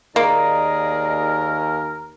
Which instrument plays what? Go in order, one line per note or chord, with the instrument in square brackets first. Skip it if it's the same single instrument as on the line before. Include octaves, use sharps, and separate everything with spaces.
[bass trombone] D#2 [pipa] A#3 [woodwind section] G#4 D5 D#5 [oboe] A#4